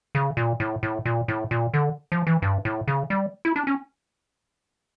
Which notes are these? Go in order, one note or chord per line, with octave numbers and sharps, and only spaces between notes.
C#3
A#2
A2
A2
A#2
A2
A#2
D3
F3
E3
G2
A2
C#3
G3
E4
D4
C#4